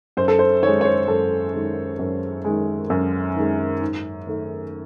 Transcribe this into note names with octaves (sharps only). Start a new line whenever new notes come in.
F#2 C5
A4
C5
D#3 G#3 C#5
C#5
C5
F#2 A4
D#3 G#3
F#2
D#3 G#3
F#2
D#3 G#3
G#2
D#3 A3